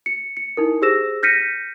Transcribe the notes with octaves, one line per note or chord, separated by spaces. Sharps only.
C#7
C#7
D#4 E4 A#4
G4 G#4 C5 E6 A#6 E7
F6 G6 A#6 B6 C#7 D#7